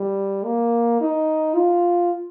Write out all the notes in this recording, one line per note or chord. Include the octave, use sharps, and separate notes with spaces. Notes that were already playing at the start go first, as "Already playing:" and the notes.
Already playing: G3
A#3
D#4
F4